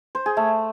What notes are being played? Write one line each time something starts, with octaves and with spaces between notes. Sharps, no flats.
C5
G#4
A3